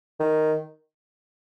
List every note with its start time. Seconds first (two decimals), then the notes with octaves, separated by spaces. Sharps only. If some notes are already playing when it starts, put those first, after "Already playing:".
0.20 D#3